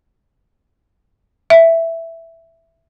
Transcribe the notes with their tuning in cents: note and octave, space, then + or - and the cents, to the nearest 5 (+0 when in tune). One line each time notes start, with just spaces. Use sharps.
E5 +5